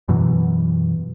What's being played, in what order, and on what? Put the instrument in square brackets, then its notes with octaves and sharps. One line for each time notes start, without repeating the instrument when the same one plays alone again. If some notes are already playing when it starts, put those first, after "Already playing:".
[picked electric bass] F#2 B2 E3 F#3